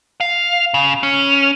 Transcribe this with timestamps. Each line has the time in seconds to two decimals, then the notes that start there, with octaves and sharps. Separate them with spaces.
0.21 F5
0.74 C#3
1.03 C#4